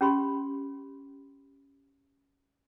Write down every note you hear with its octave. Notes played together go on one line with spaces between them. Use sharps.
C#4 G4 B5 C6